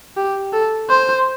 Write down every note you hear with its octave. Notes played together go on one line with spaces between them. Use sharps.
G4
A4
C5